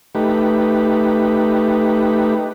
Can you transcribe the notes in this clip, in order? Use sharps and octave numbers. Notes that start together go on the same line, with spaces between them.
A3 D#4 G4 B4